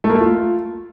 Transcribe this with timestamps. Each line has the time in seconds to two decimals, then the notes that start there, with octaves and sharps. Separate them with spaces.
0.04 A3
0.09 A#3
0.15 A3
0.20 F4